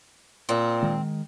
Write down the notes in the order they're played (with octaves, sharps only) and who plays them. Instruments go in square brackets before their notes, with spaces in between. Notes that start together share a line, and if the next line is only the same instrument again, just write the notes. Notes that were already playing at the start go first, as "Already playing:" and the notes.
[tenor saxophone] A#2 [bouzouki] C4
[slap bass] D#3 G#3